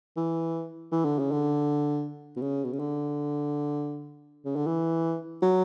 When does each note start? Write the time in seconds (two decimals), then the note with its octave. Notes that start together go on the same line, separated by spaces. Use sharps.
0.17 E3
0.92 E3
1.05 D3
1.19 C#3
1.32 D3
2.37 B2
2.42 C#3
2.65 B2
2.73 C#3
2.79 D3
4.45 C#3
4.56 D3
4.67 E3
5.42 F#3